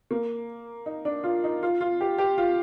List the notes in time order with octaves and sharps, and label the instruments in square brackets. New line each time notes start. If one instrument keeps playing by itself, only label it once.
[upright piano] A#3
D#4
D4
F4
D#4
F4
F4
G4
G4
F4